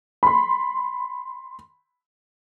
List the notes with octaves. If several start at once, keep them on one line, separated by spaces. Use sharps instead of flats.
B5 C6